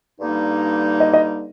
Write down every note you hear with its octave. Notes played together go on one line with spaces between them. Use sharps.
G2 D3 G3 A#3 D#4
D#5
D#5